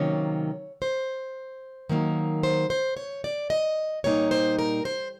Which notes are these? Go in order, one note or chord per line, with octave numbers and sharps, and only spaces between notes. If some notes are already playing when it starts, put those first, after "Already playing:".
Already playing: C3 D#3 F#3 A#3 C#4 C#5
C5
D#3 F#3 A#3 D#4
C5
C5
C#5
D5
D#5
A#2 G3 A#3 D#4 C#5
C5
A#4
C5